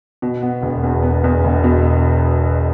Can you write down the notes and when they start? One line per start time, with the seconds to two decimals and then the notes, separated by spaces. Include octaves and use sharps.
0.22 B2
0.43 B3
0.62 E1
0.84 E2
1.03 B3
1.24 E2
1.44 E1
1.64 B2